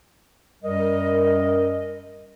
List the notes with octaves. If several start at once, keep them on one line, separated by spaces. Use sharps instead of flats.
F#2 G3 A#4 D#5